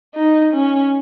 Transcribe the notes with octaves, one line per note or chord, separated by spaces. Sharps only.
D#4
C#4